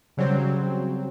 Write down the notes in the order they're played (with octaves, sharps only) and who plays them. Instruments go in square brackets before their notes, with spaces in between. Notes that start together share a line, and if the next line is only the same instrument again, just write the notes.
[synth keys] C#3 F#3 G3 C4